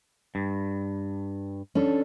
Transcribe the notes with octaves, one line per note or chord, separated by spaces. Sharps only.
G2
C#4 D4 A4